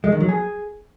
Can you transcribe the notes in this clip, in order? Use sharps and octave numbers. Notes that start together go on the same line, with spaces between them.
G#3
D#3
F#3
G#4